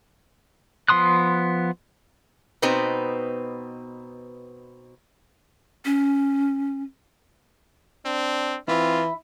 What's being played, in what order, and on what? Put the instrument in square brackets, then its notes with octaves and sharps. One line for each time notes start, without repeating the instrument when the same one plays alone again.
[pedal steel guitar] F3 B3 C6 D#6 F#6
[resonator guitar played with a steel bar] B2 B3 C4 D#4 B4 C5
[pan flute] C#4
[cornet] C4 [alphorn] D4
[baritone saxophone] E3 [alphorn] C4 [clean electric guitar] E4 [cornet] F4